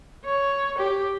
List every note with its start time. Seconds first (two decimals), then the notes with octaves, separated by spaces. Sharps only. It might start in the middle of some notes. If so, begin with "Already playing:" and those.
0.25 C#5
0.79 G4